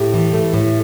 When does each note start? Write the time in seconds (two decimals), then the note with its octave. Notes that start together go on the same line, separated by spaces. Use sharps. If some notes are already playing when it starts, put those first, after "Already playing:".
Already playing: A2 E4 G4
0.14 E3
0.34 A3
0.54 A2